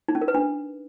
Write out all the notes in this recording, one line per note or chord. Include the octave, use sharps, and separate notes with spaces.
D#4
C#4
A#4
B4
D4